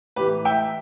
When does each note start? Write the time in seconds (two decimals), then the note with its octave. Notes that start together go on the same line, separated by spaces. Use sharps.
0.16 A2 E3 G4 B4
0.45 E5 G5